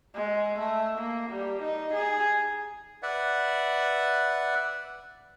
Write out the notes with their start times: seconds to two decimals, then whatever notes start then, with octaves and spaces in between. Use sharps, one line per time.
0.15 G#3
0.59 A3
0.98 A#3
1.30 G3
1.63 D#4
1.94 G#4
3.03 B4 D5 E5 F#5